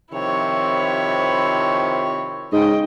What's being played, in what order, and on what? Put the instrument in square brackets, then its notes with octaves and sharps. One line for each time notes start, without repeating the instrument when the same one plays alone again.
[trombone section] C3 D#3 F3 [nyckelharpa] E4 C#5
[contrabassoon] G#2 [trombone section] C#3 [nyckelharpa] D#5 G5